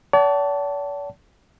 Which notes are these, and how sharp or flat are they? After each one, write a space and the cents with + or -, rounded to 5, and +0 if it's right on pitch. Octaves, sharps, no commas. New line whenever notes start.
D5 -45 F#5 +45 A5 +0